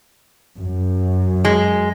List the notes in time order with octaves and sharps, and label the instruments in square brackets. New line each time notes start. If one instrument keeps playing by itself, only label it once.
[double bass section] F#2
[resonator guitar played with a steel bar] G#3